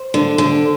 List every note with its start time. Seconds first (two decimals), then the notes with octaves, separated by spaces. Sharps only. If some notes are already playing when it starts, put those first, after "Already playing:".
Already playing: C5
0.14 D3
0.38 D3